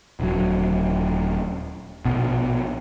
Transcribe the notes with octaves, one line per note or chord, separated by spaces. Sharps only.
D#1 F#3
A#1 B2